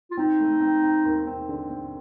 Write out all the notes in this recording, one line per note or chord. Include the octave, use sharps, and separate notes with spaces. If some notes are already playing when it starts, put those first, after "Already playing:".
F4
C4 D#4
A3
C4
C4
D#2
C4
D3
C4